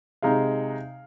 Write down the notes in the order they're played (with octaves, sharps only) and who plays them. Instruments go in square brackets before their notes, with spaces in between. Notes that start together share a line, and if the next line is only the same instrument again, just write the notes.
[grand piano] C3 G#3 D#4 F5